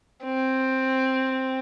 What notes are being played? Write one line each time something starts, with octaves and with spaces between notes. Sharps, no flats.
C4